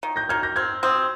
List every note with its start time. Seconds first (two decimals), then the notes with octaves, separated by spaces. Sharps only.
0.03 D#3
0.16 G6 A#6
0.29 D#3 F6 G#6
0.43 G6 A#6
0.56 C4 F6 G#6
0.83 C4 D#6 G6